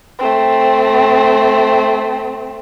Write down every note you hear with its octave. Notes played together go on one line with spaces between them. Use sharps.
A3 C4